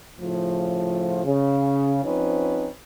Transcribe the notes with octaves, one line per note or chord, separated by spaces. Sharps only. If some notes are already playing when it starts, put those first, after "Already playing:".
A2 C#3 F3
C#3
F3 C4 C#4 D#4 B4